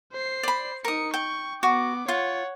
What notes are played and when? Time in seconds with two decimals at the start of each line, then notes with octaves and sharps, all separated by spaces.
0.13 C5 C7
0.43 D5 B5
0.85 D#4 A#4 D#6 C#7
1.14 G5 C#6
1.63 B3 F#4 D6
2.08 F4 C#5 F#5